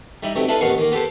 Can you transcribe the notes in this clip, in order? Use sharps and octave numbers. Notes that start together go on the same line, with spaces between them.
G3 D#4 E4
B1 C3 A3
D4 E4 G#4 A4 B4 F5
A1 D#2 B3 F5 C#6
D#3 A#3
B3 G4 A4 C5